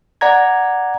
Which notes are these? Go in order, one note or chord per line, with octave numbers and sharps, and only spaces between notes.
D5 F#5 A#5 G#6